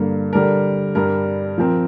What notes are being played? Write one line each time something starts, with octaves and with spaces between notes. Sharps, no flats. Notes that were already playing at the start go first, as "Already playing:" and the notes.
Already playing: G2 D3 A#3
D3 G3 D4 A#4
G2 G3 D4 A#4
F3 C4 A#4